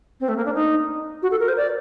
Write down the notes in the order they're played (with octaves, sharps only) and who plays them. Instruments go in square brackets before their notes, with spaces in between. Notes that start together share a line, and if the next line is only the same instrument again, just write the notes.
[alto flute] C4
A3
A#3
D4
D#4
F#4
A4
A#4
C5
D5